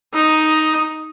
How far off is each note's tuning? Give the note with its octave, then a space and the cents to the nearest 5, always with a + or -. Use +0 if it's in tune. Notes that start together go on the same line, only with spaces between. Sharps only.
D#4 +5